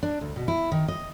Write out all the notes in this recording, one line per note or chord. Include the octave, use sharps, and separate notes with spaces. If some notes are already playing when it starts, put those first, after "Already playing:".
D4
D2
B2
E4
D#3
D#5